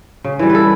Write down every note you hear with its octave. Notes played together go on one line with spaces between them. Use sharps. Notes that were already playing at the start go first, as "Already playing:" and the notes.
C#3
E3 G3
B4
A4